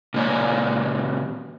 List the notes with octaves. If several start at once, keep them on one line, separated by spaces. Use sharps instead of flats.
A#2 C#3 A#3 C#5 D5 G#5